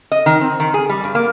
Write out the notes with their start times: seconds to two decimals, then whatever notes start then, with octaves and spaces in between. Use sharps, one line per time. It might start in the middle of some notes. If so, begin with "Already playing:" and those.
0.12 D#5
0.26 D#3
0.41 C4
0.60 D#3
0.74 G#4
0.89 G3
1.04 G2
1.15 A#3